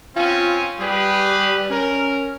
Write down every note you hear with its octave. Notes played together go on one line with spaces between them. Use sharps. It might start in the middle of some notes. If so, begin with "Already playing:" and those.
C4 C#4 F4 G#5
G3 G4 G#4 B4
C#4 A#4